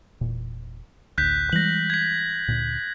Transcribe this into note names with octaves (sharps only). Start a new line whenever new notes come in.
E1 A#2
A1 D2 F#6 G6 B6
E3 G3 G#3 A#6 F#7
G#6 B6
D2 A#2